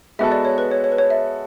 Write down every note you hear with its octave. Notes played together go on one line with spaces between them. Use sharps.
G#3 B3 F#4 A4 E5
D5
C#5
B4
C#5
C#5
B4
C#5
E5